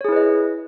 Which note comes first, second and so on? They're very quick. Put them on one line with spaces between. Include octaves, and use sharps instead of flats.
C#5 G#4 E4 B4 D#5